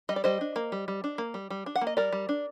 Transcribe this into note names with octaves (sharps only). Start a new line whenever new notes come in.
G3 D#5
D5
G3 C5 D#5
D4
A#3
G3
G3
D4
A#3
G3
G3
D4
F#5
A#3
D#5
G3 A#4 D5
G3
D4